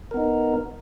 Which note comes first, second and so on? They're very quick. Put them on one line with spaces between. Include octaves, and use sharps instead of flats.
A#4 B3 D#4